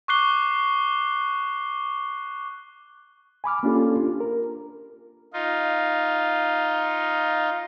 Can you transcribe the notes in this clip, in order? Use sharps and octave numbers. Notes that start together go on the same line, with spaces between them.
C#6 D6 F#6 C7 G7
G#5 B5 D6 F6
A#3 C#4 D4 F4 G4 A4
F4
A#4
D#4 F4